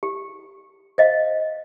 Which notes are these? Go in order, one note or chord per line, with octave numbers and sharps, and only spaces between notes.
G4
C5 D#5 F5